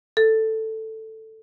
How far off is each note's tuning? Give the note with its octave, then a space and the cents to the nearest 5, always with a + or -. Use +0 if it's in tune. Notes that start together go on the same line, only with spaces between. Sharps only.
A4 +5